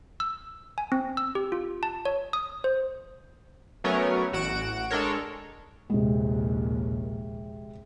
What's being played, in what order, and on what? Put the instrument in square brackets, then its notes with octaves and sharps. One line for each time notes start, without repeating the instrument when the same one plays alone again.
[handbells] E6
G#5
C4
E6
G4
F4
A5
C#5
D#6
C5
[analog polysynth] F#3 A3 B3 C#4 A#4 C#5
A1 F#4 F#5 D7 E7
G#3 D4 A4 A#4 C#5
[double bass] A#1 D#2 [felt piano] C3 G#3